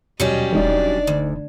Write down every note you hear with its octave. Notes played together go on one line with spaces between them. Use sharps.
D#2 B2 F#3 G3 C#4 D#5
E1 D4 D#4 D5 D#5
D2